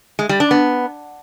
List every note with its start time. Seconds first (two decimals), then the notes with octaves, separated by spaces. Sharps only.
0.19 G#3
0.29 G3
0.40 D4
0.51 B3